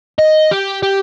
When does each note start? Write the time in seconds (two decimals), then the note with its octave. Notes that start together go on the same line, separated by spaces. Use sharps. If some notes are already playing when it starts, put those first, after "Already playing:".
0.19 D#5
0.51 G4
0.83 G4